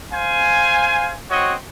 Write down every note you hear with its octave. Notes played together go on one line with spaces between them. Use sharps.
C5 F5 G#5
C4 F#4 C#5 D#5